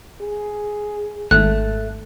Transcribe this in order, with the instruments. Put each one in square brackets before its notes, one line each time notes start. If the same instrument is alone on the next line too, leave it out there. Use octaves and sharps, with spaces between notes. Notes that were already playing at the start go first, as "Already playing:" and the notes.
[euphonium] G#4
[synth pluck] G#1 [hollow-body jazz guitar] A3 [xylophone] F#6